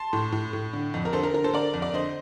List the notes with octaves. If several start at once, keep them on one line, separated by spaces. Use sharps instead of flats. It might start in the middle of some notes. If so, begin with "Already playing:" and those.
Already playing: A5 C6
A2
A2
A2
D3
F2
A#4
D3 A4 C5
A#4
D3 A#4
A4 C5
D3 A#4 D5
F2
D5
D3 C5 D#5